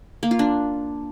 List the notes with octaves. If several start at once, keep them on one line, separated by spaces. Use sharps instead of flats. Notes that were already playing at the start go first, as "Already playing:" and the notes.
A#3
F4
D4